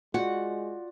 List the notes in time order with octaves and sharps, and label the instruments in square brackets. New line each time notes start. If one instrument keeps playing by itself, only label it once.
[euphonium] G#3 [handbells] F4 D5 [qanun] F#4 [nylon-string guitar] F#5